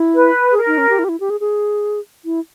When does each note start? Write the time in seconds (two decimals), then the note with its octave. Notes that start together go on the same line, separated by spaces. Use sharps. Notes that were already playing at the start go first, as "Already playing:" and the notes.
Already playing: E4
0.14 B4
0.51 G#4
0.57 A#4
0.67 D#4
0.78 C#4
0.89 G4
0.99 E4
1.04 G4
1.09 E4
1.20 G4
1.30 G#4
1.40 G#4
2.25 E4